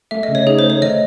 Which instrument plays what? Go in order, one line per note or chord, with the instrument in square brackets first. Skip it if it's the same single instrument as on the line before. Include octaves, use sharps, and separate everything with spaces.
[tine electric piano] A3 [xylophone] E5
[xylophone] D#5
[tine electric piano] C#3
[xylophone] C#5
[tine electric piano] D#4 [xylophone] G#4
[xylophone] C5
[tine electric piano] A3
[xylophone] C#5
[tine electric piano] D#3 [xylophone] D#5